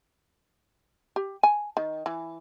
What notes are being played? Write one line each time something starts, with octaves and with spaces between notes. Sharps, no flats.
G4
G#5
D#3
E3